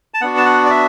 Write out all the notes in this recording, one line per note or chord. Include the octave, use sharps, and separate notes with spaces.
A5
B3 D4 F#4 F#5
A5
F#5
D5
E5